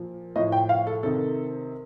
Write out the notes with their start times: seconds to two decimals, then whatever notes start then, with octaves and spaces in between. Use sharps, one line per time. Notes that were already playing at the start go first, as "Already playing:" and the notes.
Already playing: A#2 F3
0.36 A2 F3 D#5
0.52 G5
0.69 F5
0.87 A4
1.03 C3 D#3 A4